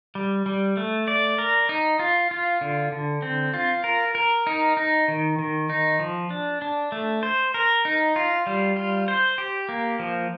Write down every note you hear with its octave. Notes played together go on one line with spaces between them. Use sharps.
G3
G3
A3
D5
A#4
D#4
F4
F4
D3
D3
C4
F4
A#4
A#4
D#4
D#4
D#3
D#3
D#4
F3
D4
D4
A3
C5
A#4
D#4
F4
G3
F4
C5
G4
A#3
F3